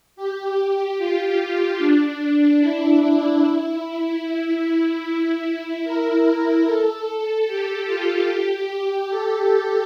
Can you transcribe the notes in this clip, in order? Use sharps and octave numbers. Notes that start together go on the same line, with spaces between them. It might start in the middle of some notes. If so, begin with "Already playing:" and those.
G4
F4
D4
E4
A#4
A4
G4
F4
G4
A4